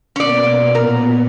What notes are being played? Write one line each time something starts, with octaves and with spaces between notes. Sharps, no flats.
B2 A#3 B3 C#4 D5
A#2 B3 A#4